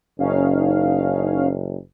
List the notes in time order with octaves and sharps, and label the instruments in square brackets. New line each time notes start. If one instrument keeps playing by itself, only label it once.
[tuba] F#1 [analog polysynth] C#4 D#4 F5